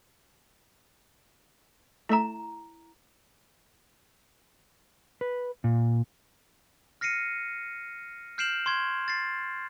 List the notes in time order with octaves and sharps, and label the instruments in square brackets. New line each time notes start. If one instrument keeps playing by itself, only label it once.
[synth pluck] A3 E5 [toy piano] E4 A#5
[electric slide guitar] B4
A#2
[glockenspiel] F6 A#6 C7 C#7 D#7
F6 G6 C7 D7 E7 F#7
C6 C#6 G#6
A6 C7